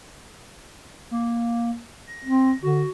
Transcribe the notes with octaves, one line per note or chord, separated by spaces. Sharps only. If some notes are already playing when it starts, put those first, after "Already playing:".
A#3
A#6
C4
D3 F#4